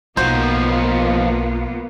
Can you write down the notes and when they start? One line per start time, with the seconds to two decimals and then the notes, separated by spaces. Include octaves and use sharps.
0.17 B1 F3 A#3 B3 D#4 F4 F#4 C5